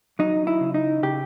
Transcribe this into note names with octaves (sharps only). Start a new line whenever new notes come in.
F#3 D#4
E4
C#3
D#4
C#3 G4